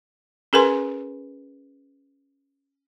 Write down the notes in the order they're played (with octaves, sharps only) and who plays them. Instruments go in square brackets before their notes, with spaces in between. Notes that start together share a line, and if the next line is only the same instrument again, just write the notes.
[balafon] C#4 G#4 A#4 B4 G#5 C6